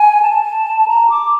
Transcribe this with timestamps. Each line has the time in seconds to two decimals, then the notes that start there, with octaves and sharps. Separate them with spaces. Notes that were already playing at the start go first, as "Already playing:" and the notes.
Already playing: G#5
0.22 A5
0.88 A#5
1.10 D6